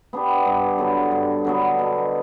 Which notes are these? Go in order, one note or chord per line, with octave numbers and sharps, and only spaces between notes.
B3 D4 G4
G2
D3 F#3 B3
G2
D3 F#3 B3
B2